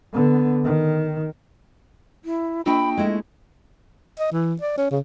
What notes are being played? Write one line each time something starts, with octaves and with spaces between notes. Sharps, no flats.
D3 B3
D#3
E4
A#3 D4 F4 G5 B5
G#3 A3 E4 D#5
D#5
E3
D5
C#4
C#3